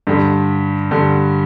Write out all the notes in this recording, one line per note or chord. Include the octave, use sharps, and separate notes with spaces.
G2 D3 G3
G2 D3 G3